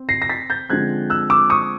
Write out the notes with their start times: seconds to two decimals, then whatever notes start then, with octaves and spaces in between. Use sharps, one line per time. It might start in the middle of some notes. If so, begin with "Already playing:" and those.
Already playing: C4
0.09 A#6 C7
0.22 A#6
0.30 A6 B6
0.50 G6 A6
0.69 D3 F3 G#3 C4 F#6 G#6
1.10 E6 F#6
1.30 D6 E6
1.50 C#6 D#6